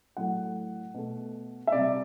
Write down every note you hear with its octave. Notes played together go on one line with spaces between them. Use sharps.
A2 F#3 A3 F#5
B2 A3
E5
C3 G3 D5